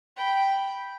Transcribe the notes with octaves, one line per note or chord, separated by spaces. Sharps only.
G5 B5